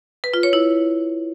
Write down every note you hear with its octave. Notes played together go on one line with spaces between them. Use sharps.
B4
F4
C#5
E4